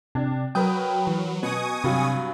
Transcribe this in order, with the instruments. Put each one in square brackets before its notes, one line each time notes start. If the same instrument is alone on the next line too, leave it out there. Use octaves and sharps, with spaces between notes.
[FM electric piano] C3 [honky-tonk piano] D4
[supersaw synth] F#3 [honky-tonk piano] A#4 B4 D#6 [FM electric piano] G5
[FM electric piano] E3
[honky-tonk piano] B2 [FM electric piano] B4 [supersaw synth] G#5 C#6 D#6
[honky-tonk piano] G2 F#3 [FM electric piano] C3